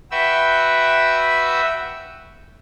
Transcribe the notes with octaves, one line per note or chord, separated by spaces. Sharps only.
F#4 B4 E5 G5 E6